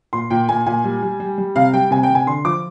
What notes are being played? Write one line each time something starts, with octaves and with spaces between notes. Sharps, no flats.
A#2 C6
A#2 G5
A#2 G#5
A#2 G#5
G3
G3
G3
G3
C3 F5
G3 G5
C3 G#5
G5
C3
G#5
D3 C6
F3 D6